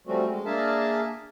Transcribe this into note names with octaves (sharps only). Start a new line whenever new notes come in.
F3 G3 A3 C4 C#4 F#4
G#3
A#3 D4 G#4 A#4 E5 A5